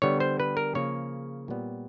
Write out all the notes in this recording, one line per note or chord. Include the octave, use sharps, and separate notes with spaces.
D3 G3 B3 C#5
C5
B4
A#4
C#3 F3 A#3 C#4 C#5
A#2 G3 B3